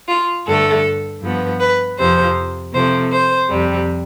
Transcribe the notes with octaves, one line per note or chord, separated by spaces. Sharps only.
F4
G2 D3 A3 A4
G2 F3 B3
B4
F2 C3 F3 C5
C3 F3 A3 C5
C5
F2 C3 G3